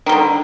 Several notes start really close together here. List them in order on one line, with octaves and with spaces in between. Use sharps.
D#3 G3 D3